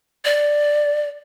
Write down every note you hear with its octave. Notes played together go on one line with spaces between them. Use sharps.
D5